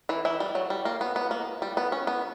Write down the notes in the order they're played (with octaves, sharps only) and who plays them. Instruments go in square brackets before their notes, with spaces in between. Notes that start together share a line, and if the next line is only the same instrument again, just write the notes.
[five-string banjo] E3 E4
E3 E4
G3
F#3
G3
A#3
B3
B3
A#3
G3
B3
C#4
B3